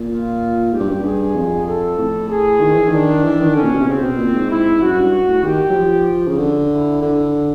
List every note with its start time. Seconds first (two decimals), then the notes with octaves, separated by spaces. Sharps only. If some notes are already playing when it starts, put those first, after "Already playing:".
Already playing: A#2
0.10 F4
0.72 G#2 G4
0.80 G2
0.88 F#2
0.96 G2
1.04 G#4
1.36 F2
1.66 A4
1.98 A2
2.29 G#4
2.60 D#3
2.75 E3
2.88 D#3 D4
3.24 E3
3.40 D#3
3.55 D3 C#4
3.63 A#2
3.71 B2
3.80 C3
3.87 C#3 C4
4.02 B2
4.18 A#2
4.34 G#2
4.50 E4
4.81 F#2 F#4
4.97 G2
5.28 A2
5.43 D#3 G4
5.69 F#3
5.75 F3
6.28 C#3
6.38 D3
6.70 E4
7.02 D3